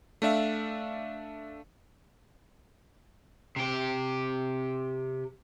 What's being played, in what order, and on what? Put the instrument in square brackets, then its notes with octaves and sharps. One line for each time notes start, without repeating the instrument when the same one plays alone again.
[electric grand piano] A3 D4 E5 F5
[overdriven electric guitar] C3 G4